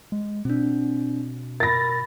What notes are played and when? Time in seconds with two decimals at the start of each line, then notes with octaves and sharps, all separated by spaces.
0.12 G#3
0.45 B2 C4 D4
1.60 A#4 B5 A6 A#6